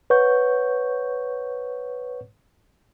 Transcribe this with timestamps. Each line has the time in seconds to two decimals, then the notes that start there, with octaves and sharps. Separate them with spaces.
0.10 B4 C#5 F#5 C#6 G6